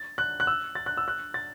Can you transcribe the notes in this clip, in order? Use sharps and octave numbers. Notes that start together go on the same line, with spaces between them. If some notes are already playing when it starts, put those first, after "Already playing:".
Already playing: A6
F#6
F#6
E6
A6
F#6
E6
F#6
A6